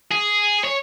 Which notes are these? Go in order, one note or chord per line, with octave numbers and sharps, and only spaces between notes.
G#4
C#5